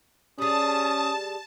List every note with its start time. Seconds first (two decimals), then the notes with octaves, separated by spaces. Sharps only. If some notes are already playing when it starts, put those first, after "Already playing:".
0.38 G3 C#4 G#4 A5 D#6